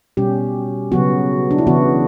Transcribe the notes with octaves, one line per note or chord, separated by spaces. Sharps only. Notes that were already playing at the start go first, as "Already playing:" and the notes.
B2 G3 C#4 G4
C#3 F#3 B3 F#4
D4
E4
C#3 E3 B3 F#4